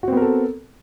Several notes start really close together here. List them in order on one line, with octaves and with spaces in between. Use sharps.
F#4 C4 B3 A#4 A4